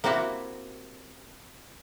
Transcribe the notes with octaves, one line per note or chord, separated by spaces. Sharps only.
A#3 C4 E4 F#4 G4